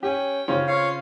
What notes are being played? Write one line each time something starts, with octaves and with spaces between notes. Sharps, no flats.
C#4 G4 G5
C#3 C4 C#4 F4
F4 C#5 F5